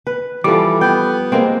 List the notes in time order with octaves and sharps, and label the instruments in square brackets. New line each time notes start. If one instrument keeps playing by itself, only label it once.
[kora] B4
[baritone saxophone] E3 [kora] F3 G3 [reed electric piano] A4 D6
[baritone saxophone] B3 [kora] G5
[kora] G#3 A#3 C4